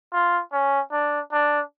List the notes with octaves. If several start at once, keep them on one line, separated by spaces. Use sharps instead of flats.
F4
C#4
D4
D4